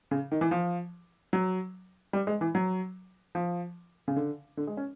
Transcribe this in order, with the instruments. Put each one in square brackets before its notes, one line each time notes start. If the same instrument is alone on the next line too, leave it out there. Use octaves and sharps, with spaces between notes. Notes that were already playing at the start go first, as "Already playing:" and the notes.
[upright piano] C#3
D#3
E3
F3
F#3
G3
G#3
E3
F#3
F3
C#3
D3
D3
G#3
C#4